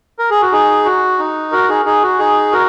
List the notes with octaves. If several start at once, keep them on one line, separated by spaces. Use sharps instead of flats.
A#4
G#4
F#4
D#4 G#4
F#4
D#4
F#4 A#4
D#4 G#4
D#4 G#4
F#4
D#4 G#4
F#4 A#4